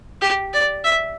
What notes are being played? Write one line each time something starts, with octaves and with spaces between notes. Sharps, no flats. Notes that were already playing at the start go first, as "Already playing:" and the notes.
G4
D5
E5